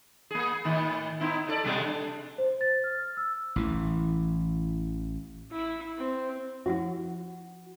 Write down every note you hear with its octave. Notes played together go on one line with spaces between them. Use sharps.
A#3 G#4
A2 D#3
B3 D#4 E4
C#3 A4 D5
B2 G3 G#3
D4
C5
A6
F6
E6
A1 E3
E4
C4
F3 E4 F#4 F#5